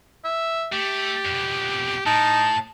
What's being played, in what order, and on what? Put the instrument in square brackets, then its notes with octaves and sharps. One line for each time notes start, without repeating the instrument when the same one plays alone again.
[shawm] E5
[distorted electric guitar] A3 [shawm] G4
[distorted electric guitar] F2 B2
[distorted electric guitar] A2 [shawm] D#4 [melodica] A5